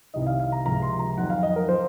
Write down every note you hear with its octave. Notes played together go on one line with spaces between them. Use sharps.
C2 C3 D#3 D#5
F5
F5
A#5
C#2 C3 F3 A#5
C6
A#5
F2 D#3 F#3 F#5
F5
D#5
A#4
F3 C5